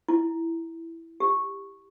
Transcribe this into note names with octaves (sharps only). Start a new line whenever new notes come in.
E4
G4